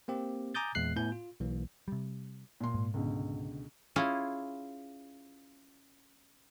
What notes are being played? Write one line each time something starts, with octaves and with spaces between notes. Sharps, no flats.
A#3 C4 G4
G#5 A#5 D6 D#6 G6 A6
E2 A#2 G#3 F#6 C7
A2 B3 E4 G#5 G6
F4
B1 E3 A#3
C3 G3
A#2 C6
G#2
C#2 B2 D3
C#4 E4 F4 G#4